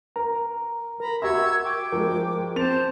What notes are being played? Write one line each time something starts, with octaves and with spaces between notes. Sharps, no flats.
A#4 A#5
A#4 A#5 B5
F#4 G4 E5 C#6 E6 G#6
G5 D6
F3 G#3 A#4
C4 C5 A5 A6 F7